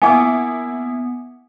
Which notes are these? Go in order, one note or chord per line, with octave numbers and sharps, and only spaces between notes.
A#3 B3 E4 G#5 D6